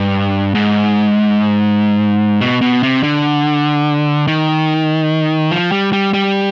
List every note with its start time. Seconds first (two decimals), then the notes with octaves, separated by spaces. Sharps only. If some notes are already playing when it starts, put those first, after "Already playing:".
Already playing: G2
0.55 G#2
2.41 B2
2.61 B2
2.83 C3
3.03 D3
4.28 D#3
5.52 F3
5.72 G3
5.93 G3
6.13 G3